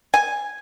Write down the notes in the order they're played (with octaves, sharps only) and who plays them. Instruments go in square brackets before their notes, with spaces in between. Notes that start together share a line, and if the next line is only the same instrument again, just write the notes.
[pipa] G#5